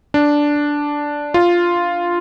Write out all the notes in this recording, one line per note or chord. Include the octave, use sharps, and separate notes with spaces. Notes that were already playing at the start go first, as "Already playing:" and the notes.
D4
F4